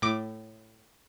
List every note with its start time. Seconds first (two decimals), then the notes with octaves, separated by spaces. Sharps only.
0.02 A2 D6